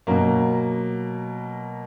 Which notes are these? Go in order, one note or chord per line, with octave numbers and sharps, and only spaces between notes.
B2 F#3 A#3